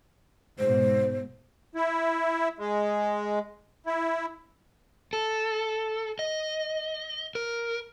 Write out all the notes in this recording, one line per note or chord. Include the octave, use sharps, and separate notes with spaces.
G#2 B2 C5
E4
G#3
E4
A4
D#5
A#4